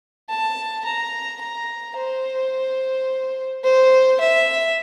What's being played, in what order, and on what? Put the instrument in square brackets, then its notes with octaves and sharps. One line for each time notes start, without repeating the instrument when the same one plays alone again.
[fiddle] A5
A#5
A#5
C5
C5
E5